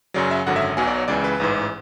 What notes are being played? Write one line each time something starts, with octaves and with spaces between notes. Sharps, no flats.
F#2 C#3 F#3 D5
E5
G#1 F#2 D3 F#3 F#5
E5
B1 B2 F#3 G#5
D5
C#5
C#2 C#3 E3 D5
B4
A1 G#2 E3